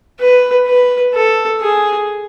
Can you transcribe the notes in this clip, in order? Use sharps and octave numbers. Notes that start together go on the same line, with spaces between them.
B4
B4
A4
G#4